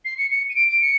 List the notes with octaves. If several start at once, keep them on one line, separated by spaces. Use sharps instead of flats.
C7
C#7
C#7
D#7
D7
D7
C#7